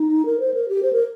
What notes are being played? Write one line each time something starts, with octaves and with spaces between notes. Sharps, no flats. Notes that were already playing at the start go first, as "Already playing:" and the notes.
Already playing: D#4
A#4
C5
A#4
G4
C5
A#4